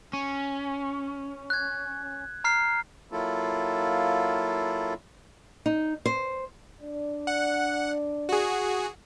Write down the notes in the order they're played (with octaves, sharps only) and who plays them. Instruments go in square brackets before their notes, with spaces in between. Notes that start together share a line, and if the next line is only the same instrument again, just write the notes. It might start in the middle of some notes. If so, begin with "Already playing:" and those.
[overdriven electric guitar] C#4
[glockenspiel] F#6 G#6
A#5 F6 C7
[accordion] F#3 A#3 E4 F4 A4
[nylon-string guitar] D#4
C5
[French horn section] D4 D5
[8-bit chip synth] F#5
F#4 G#4